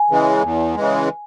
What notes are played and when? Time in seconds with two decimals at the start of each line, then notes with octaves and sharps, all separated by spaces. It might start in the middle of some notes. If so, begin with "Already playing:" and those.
Already playing: G#5
0.10 C#3 E3 G#3
0.42 E2
0.76 C#3 E3 G#3